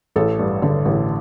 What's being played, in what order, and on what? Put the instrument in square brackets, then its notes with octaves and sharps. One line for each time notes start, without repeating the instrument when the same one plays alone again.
[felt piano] A1 A4
G2
D3
A1